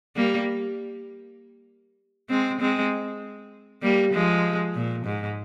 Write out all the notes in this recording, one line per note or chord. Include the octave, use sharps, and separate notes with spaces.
G3 A#3
G#3 C4
G#3 C4
G3 A#3
F3 G#3
A#2
G#2